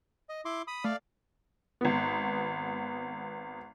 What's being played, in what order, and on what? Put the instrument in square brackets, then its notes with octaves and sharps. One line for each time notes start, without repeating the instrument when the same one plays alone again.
[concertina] D#5
E4 C6 D6
B5 D#6
[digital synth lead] A3 [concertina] D5 F5
[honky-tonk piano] G#1 B3